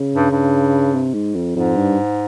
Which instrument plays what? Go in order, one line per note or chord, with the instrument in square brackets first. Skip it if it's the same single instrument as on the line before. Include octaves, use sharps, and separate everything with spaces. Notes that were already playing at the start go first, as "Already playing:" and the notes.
Already playing: [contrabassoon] C#3
[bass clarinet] G2
G2
[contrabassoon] C3
G#2
F2
[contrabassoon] F2 [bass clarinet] G#2
[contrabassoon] G2